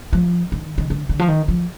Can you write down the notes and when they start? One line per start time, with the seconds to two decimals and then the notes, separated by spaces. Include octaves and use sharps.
0.13 F3
0.52 D#3
0.78 D#3
0.90 D3
1.09 D3
1.19 F3
1.28 D#3
1.48 F3